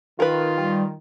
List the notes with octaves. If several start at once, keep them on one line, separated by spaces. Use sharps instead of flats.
D#3 F4 A#4 B4
G3